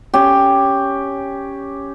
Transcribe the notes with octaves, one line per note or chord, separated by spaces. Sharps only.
C#4 G4